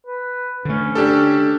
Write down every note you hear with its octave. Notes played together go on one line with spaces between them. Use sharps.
B4
D3 A3 C#4
D4 G4 A4